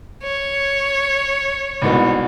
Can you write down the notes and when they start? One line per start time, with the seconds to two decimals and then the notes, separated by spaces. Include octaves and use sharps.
0.23 C#5
1.82 C2 G#2 B2